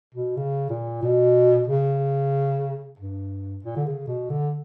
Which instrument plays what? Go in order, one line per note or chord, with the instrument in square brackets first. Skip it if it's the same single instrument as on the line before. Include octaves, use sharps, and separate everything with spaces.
[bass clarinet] B2
C#3
A#2
B2
C#3
G2
A#2
D3
C#3
B2
D3